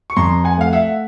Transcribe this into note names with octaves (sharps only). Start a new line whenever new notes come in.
C#6
F2 A#5 C6
F#5 G#5
A3 F5
E5 F#5